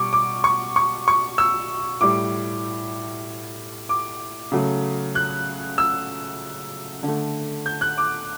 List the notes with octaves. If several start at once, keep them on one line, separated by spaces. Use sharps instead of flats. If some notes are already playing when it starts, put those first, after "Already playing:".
Already playing: B2 G3 C#6 D6
D6
C#6
C#6
C#6
E6
A2 G3 D6
D6
C#3 F#3 A3
F#6
E6
D3
A3
G6
F#6
D6